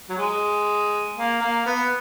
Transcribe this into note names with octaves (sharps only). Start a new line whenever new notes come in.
F#3
G#3
A#3
A#3
B3